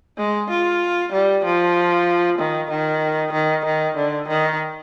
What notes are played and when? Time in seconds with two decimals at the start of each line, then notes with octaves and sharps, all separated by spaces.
0.18 G#3
0.50 F4
1.12 G3
1.44 F3
2.38 D#3
2.70 D#3
3.33 D#3
3.65 D#3
3.96 D3
4.28 D#3